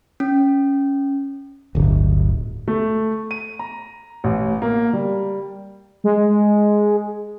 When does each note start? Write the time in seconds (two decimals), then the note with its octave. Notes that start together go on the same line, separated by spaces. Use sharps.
0.20 C#4
1.75 D1 G1
2.68 A3
3.31 D#7
3.59 A#5
4.24 A1
4.62 A#3
4.93 G3
6.04 G#3